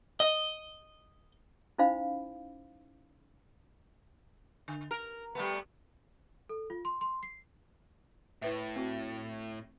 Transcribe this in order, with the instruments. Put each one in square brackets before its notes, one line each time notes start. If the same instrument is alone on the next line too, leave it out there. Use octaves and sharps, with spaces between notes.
[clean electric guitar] D#5
[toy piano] C#4 D#4 E4 C5 F5 B5
[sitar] D3
A#4
G3 A3 B3
[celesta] A4
F4
C6
C6
C7
[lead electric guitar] A2 [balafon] E4 B4 E5
[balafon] C4 F#4